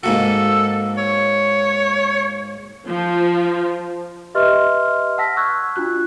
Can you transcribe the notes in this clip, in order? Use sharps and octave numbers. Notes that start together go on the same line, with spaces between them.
G#2 A#3 F#4 A4
C#5
F3
G4 B4 D#5 E5 C6 F6
F#5 A5 E6 F6 A#6 B6
C#6 E6 F#6 G#6
D4 F4 F#4 F#6